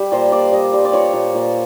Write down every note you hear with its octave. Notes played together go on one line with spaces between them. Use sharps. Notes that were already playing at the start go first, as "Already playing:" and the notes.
Already playing: G3
A#2 C5
A#2 D5
G3 D#5
G3
D5
F3 C#5
A#2
A#2